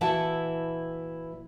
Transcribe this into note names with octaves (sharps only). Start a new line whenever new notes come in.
A#2 E3 E4 F#4 F#5 A5